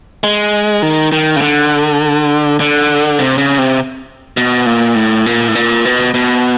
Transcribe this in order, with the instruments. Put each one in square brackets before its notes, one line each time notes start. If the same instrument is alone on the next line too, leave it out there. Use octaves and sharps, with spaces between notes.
[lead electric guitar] G#3
D#3
D#3
C#3
D3
D3
C3
C#3
C3
B2
A#2
A2
A#2
A2
A#2
B2
B2